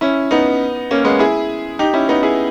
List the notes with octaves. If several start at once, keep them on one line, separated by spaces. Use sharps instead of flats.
C#4 E4
B3 D#4
A#3 C#4
G#3 B3
E4 G#4
D#4 G4
C#4 E4
B3 D#4
E4 G#4